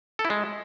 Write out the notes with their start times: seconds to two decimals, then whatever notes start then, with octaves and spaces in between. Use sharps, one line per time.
0.19 A4
0.25 E4
0.30 G#3